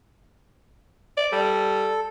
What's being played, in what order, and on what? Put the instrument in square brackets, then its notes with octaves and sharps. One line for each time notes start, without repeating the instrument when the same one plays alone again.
[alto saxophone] D5
[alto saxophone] G3 [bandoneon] A4